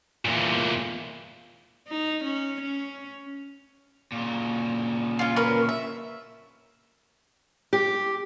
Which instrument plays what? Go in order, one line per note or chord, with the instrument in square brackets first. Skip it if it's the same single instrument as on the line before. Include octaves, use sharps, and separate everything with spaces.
[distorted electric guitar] E2 A#2
[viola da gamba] D#4
C#4
C#4
[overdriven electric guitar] A#2 C#3
[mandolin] C#4 F4
C#4 A#4 B4
E5
[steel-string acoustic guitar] G4